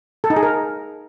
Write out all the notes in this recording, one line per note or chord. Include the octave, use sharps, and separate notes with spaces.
A4
D#4
G#4
A#4